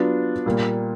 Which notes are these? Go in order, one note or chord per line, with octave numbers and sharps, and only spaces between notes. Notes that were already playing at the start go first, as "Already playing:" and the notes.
Already playing: F#3 B3 D4 F4
A#2 G3 A#3